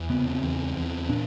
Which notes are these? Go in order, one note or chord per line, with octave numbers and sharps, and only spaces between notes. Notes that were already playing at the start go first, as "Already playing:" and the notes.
Already playing: E2
C#3 B3
C4
E2
E2
A#2 D4